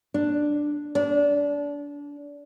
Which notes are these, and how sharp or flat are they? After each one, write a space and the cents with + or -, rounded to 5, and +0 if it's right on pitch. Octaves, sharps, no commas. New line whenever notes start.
D4 +5
D4 -25